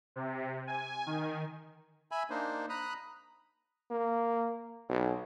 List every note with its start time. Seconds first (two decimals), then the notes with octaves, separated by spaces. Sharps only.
0.16 C3
0.67 G#5
1.06 D#3
2.11 E5 G#5 B5
2.30 A#3 D4 D#4 C5
2.70 A#5 B5 D#6 F#6
3.91 A#3
4.89 B1